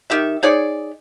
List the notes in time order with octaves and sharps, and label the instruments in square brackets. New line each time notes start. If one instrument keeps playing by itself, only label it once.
[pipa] D#3 G4 E5
D#4 G#4 C#5 D5